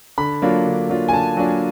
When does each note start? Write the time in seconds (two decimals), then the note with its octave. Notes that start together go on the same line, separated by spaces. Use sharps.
0.18 D3 B5
0.42 F#3 A#3 D4 F4
0.66 D3
0.89 F#3 A#3 D4 F4
1.08 G#5
1.13 D3 A5
1.37 F#3 A#3 D4 F4